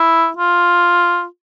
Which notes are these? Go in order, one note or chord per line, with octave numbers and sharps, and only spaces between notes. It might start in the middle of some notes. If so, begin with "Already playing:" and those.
Already playing: E4
F4